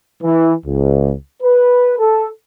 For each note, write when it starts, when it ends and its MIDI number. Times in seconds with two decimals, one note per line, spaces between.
0.23 0.53 52
0.66 1.13 37
1.42 1.94 71
1.98 2.27 69